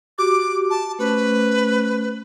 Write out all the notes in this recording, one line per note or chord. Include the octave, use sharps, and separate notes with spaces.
F#4 G4 D6
A5
A3 C#4 B4 C5